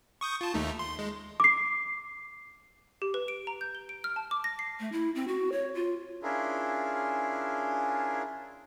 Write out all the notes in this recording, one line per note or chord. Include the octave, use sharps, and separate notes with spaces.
C#6 D#6 G6
F4 A5
D#2 A3 D#4
C6
G#3
D6 C7
G4
B4
D7
A#5
G6
G7
D7
F6
A5
D6
A#6
C7
A3
E4
C4
F#4
C#5
F4
C#4 D4 E4 F4 G#4 A#4